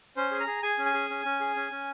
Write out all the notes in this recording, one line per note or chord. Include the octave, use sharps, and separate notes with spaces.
C#4 C5
G#4
A#5
G#4
G#4 G#5
C#4
G#5
G#4
C#4
C#4
G#4
C#4
C#4